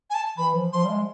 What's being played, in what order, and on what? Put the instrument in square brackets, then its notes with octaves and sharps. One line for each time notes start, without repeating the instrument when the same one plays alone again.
[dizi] G#5
A5
[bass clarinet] E3 [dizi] B5
[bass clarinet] F3
[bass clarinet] F3 [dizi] C6
[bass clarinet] G3
G#3